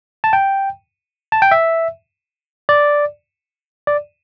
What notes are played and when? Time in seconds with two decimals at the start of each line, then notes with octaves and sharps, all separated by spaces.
0.24 A5
0.33 G5
1.32 A5
1.42 G5
1.51 E5
2.69 D5
3.87 D5